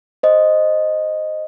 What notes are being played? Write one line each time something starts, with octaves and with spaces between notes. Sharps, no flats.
C5 D#5